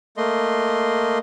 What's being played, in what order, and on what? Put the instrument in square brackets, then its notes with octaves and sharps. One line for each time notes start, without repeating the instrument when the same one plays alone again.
[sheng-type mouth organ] A3 A#3 D#5 C6